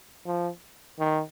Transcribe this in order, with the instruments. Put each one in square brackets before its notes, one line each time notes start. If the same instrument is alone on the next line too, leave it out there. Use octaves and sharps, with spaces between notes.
[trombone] F3
D#3